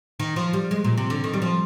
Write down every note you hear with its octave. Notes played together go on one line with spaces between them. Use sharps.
D#3
F3
G3
G#3
A#2
C3
D3
D#3
G3
F3